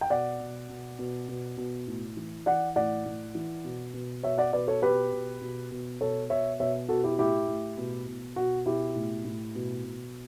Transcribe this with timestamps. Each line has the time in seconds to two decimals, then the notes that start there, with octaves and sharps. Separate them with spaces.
0.01 G5
0.10 B2 D5 F#5
0.40 B2
0.69 B2
0.99 B2
1.28 B2
1.57 B2
1.87 A2
2.17 E3
2.46 E3 D5 F#5
2.76 A2 D5 F#5
3.06 A2
3.35 E3
3.64 B2
3.94 B2
4.23 B2 C#5 E5
4.38 D5 F#5
4.53 B2 B4 D5
4.68 A4 C#5
4.82 B2 G4 B4
5.12 B2
5.42 B2
5.71 B2
6.00 B2 A4 C#5
6.30 B2 C#5 E5
6.60 B2 C#5 E5
6.89 B2 F#4 A4
7.04 E4 G4
7.18 A2 E4 G4
7.48 A2
7.77 B2
8.07 B2
8.36 B2 F#4
8.66 B2 E4 G4
8.95 A2
9.25 A2
9.55 B2
9.84 B2